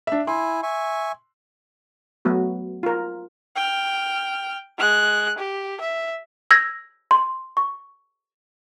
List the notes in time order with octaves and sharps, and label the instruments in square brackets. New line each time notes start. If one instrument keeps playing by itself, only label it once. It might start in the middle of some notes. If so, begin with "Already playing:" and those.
[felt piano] D4 E5
[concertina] E4 G#5 [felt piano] C6
[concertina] E5 G#5 C#6
[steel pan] F#3 A3 B3 F#4
F4 A#4
[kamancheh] G5 F6
G#3 F#6
G4
E5
[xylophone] E6 G6 G#6 A#6
C6
C#6